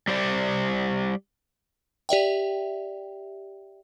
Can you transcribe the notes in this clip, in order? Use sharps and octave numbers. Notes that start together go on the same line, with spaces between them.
G3 G4 C5 D5
G4 D5 E5 G5